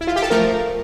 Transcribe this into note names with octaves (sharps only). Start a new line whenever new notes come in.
E4
F4
G4
A4
F3 A3 A#4